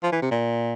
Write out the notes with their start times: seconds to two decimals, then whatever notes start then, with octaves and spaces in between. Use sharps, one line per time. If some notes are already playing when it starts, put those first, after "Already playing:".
0.03 F3
0.12 E3
0.22 C3
0.31 A#2